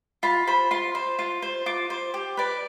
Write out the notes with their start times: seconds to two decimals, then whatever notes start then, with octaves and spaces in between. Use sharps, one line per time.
0.23 F4 B5
0.47 C5 B5
0.71 F4 C6
0.95 C5
1.19 F4
1.42 C5
1.66 F4 D6
1.90 C5
2.14 G4
2.37 B4 D5